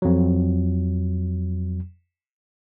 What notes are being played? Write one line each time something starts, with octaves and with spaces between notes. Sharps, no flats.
F2 F#3